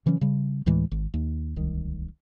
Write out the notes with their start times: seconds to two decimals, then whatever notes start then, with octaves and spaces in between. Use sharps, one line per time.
0.06 C#3 E3 F#3 C#4
0.21 C#3 G3
0.66 D2 A2 E3 G#3
0.91 G#1
1.14 D#2
1.56 D1 C2 D#3